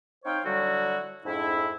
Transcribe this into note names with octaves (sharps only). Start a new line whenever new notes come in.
C4 D#4 C5 C#5 F5 G5
D3 F#3 G3 E4 F#4
F2 G#2 D4 E4